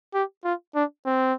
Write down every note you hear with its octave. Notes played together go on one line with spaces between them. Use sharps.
G4
F4
D4
C4